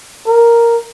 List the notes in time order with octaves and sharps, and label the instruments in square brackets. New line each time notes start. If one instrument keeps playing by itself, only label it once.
[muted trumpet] A#4